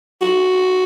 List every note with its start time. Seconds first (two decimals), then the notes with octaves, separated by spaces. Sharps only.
0.22 F#4